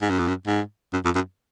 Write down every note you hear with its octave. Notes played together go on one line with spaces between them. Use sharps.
G#2
F#2
F2
F#2
G#2
F#2
F2
F#2